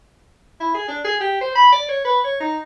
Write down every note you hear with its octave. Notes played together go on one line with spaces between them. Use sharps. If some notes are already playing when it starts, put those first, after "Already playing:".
E4
G#4
D4
G#4
G4
C5
B5
D5
C#5
B4
C#5
D#4